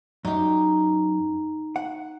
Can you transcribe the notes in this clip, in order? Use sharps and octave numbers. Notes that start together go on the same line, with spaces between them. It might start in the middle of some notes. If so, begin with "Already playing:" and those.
F#2 D#4 G4
F#5